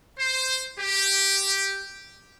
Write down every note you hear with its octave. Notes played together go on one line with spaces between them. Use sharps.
C5
G4